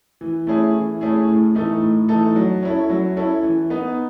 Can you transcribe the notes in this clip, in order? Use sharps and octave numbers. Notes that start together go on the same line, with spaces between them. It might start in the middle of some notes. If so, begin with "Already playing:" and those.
E3
A3 C#4 E4 G#4
E3
A3 C#4 E4 G#4
A2
E3 A3 D#4 A4
A2
E3 A3 D#4 A4
F#3
C#4 E4 A4
F#3
C#4 E4 A4
E3
B3 D#4